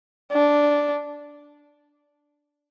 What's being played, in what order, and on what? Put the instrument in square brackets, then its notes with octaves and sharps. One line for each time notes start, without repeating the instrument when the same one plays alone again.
[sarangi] D4